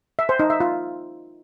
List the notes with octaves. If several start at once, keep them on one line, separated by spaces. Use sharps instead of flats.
E5
C5
D#4
E5
F4